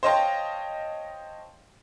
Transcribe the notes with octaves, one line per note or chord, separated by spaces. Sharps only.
C5 C#5 D#5 F5 G5 A5